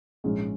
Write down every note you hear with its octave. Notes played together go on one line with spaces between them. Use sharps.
A#1 G#2 G#3 C#4